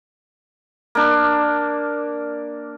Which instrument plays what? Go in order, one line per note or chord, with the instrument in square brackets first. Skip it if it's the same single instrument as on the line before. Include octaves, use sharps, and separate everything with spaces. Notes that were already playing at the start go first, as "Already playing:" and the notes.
[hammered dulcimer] A#3 D4